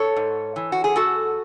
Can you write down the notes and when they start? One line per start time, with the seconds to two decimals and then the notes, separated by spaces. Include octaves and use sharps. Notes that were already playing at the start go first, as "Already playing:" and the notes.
Already playing: A4 C#5
0.16 G#2
0.56 E3
0.72 F#4
0.84 G#4
0.96 F#2 F#4 A4